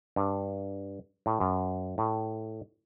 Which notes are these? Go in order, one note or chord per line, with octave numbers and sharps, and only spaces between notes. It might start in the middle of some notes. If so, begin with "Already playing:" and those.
G2
A2
F#2
A2